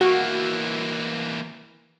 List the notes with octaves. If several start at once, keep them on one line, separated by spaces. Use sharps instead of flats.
E3 A#3 F#4